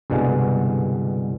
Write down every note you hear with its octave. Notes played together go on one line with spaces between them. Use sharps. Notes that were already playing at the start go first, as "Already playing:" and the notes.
C2 G2 B2 D3 G#3